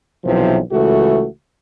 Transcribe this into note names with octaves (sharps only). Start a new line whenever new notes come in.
B1 C3 E3 F3
C#2 E3 A3 F#4